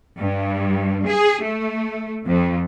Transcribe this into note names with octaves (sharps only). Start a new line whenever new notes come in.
G2
G#4
A3
F2